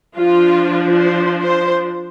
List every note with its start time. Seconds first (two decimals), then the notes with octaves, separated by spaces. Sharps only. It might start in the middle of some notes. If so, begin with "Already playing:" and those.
0.17 F3 D4 F4
1.00 C5
1.41 C5